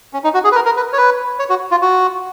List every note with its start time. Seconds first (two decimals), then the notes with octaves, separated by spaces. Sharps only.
0.13 C#4
0.24 D#4
0.34 F#4
0.44 G#4
0.52 B4
0.55 A#4
0.65 A#4
0.77 B4
0.93 C#5
0.98 B4
1.39 C#5
1.50 F#4
1.71 F4
1.82 F#4